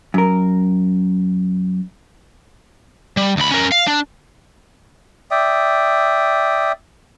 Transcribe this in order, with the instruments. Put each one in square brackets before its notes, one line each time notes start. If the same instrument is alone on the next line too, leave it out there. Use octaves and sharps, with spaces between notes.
[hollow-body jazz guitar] F#2 A#4
[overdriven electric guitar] G3
D2 B5
C#4 A#4
F5
D4
[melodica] D5 E5 G5 D#6